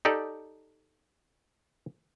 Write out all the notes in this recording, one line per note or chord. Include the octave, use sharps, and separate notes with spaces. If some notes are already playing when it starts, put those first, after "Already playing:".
D#4 G4 A4 D5